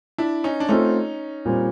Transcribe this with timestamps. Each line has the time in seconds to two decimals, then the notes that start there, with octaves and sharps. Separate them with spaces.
0.18 D4 E4
0.44 C#4 D#4
0.60 D4
0.69 A3 C4 C#4 D#4 F4 A4
1.45 A#2 G3 C4